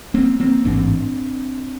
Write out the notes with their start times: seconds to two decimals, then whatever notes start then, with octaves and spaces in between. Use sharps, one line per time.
0.14 A#3 C4
0.40 A#3 C4
0.65 A1 G#2 C4 D4